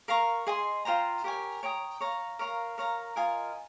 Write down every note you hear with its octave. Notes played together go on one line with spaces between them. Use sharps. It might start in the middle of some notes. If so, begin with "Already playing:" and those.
A#4 F5 A#5 C#6
G#4 D#5 G#5 C6
F4 C5 G5 A#5
G4 A#4 C#5 G#5
C#5 G5 A#5 D#6
C#5 F5 A#5
A#4 C#5 F5 A#5
A#4 C#5 F5 A#5
F4 A#4 D#5 G#5